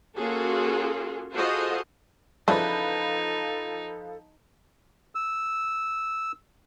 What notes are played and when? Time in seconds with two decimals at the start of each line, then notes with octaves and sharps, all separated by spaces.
0.16 A#3 C#4 F4 F#4 G#4 A4
1.33 F4 F#4 G#4 A4 C5 D#5
2.48 C#3 E3 F3 D4 D#4 A4 B4
5.15 E6